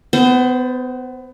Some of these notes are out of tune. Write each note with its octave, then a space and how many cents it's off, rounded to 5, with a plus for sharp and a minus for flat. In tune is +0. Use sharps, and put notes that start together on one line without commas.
B3 +30 C5 +0